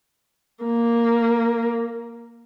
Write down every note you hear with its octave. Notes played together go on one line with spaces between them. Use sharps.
A#3